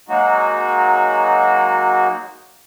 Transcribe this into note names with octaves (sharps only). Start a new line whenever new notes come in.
F#3 G#3 A#3 D#4 F#4